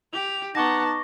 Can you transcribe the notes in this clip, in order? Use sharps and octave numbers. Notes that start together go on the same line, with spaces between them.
G4 F7
B3 D#4 F#5 A5 C#6 D6 A#6